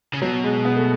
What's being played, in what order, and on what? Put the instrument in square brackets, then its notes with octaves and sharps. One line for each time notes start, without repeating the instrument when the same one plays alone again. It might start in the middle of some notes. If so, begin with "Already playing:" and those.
[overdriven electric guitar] C#3
[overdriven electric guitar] B2 [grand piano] F#3
[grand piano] G#3
B3
A3